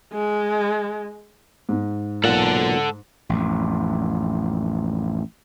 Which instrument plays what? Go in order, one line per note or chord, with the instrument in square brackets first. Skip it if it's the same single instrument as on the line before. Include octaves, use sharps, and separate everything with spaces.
[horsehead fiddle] G#3
[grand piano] G#2
[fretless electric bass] B1 A#2 [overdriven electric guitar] A4 F#5
[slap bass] A1 F2